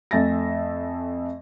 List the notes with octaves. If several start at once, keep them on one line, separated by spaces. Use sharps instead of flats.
F2 A3 E5 G#5 A6 A#6